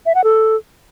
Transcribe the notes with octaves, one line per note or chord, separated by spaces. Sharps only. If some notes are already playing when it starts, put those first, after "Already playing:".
E5
F#5
A4